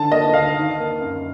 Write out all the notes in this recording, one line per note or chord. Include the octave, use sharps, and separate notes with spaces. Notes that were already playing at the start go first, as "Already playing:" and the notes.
Already playing: D3 A5
A#3 D#5
D2 F5
D#3
A#3
F#2